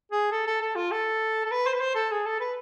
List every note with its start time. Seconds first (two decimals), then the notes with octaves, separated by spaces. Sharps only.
0.12 G#4
0.32 A4
0.47 A4
0.61 A4
0.76 F4
0.91 A4
1.45 A4
1.51 B4
1.66 C5
1.74 B4
1.80 C5
1.95 A4
2.11 G#4
2.25 A4
2.40 B4